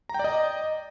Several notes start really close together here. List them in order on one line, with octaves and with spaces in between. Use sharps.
A#5 G5 D5 D#5